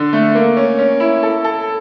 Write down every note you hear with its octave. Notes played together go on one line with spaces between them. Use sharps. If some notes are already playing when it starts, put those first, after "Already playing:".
Already playing: D3
A3
A#3
C#4
C#4
E4
A4
A4